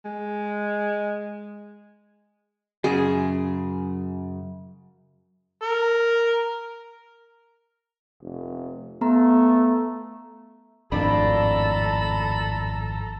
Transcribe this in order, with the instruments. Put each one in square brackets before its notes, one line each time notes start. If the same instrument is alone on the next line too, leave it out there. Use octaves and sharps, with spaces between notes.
[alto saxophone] G#3
[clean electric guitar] F#2 C#3 [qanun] G#4
[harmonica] A#4
[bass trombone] F1
[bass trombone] A3 [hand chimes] B3 A#5
[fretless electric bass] G#1 F2 A2 [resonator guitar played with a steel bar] D4 [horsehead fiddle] A4 A#5 [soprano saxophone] B5